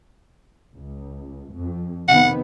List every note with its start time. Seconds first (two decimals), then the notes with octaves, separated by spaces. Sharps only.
0.73 C#2
1.53 F2
2.08 C3 D#3 B3 F#5